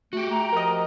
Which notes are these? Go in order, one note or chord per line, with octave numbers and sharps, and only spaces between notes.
A3 F#4 G4
A3 A#5
F3 A#4 D#5